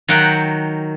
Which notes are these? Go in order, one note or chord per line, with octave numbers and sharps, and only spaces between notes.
D#3 F#3 F#5 G5